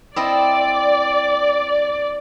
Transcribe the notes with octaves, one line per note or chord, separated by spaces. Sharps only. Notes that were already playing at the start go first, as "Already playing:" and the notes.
C4 E4 D5 D#5